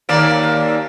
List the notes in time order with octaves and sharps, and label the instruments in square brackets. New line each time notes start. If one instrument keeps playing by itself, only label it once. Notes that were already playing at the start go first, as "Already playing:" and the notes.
[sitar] D#2 A#3 D5